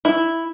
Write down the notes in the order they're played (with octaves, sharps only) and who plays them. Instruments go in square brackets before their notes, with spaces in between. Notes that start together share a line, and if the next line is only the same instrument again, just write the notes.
[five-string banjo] E4